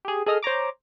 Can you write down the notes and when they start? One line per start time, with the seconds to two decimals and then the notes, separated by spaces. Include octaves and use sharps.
0.05 G4 G#4
0.26 G#4 A4 D#5 D#6 F6
0.43 C5 C#5 A#5 D6